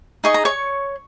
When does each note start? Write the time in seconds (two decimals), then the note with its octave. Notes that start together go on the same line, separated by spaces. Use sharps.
0.24 D#4 G#4 D#5 C#6
0.34 A#5
0.45 C#5 C#6